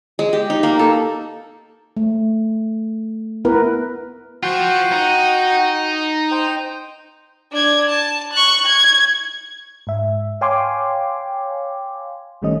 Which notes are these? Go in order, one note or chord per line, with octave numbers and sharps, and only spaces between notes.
G#3
G4
D#4
A#3
A4
A3
B3 E4 A#4 B4
F4 F#4 C5 F#5 G5
D#4
C5 G5
D4 G#6
A5
C#6 F#6
G#6
G#2 E5
C#5 F5 G5 G#5 C6 D6
A1 D#3 G3 A3 C#4 D#5